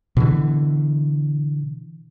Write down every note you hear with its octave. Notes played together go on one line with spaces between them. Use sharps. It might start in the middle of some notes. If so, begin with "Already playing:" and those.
B2 D3 E3